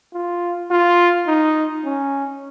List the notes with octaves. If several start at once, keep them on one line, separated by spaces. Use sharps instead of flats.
F4
F4
D#4
C#4